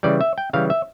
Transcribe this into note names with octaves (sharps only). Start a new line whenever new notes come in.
C#3 E3 G3 D5
E5
G5
C#3 E3 G3 F5
E5